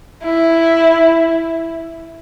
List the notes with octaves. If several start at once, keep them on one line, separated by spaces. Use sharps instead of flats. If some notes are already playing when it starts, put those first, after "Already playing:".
E4